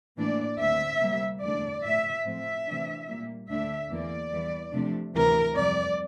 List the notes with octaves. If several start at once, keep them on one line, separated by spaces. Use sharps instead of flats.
A2 E3 A#3 D4 D5
D2 D3 A3 C4 E5
C3 G3 A#3
E2 D3 A3 D4 D5
A2 F3 A3 E5
A2 F3 A3 C4 E5
C3 E3 A3 D4
A#2 G3 A#3
D2 D3 A3 D4 E5
E2 E3 A#3 D5
E2 E3 G3
C3 F3 A3 D4
D2 C3 E3 A#4
F2 C3 G3 D5